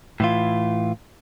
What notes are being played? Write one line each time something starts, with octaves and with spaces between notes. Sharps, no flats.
A2 E3 F4